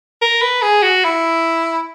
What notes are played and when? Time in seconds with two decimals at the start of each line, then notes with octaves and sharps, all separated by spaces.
0.22 A#4
0.42 B4
0.62 G#4
0.83 F#4
1.04 E4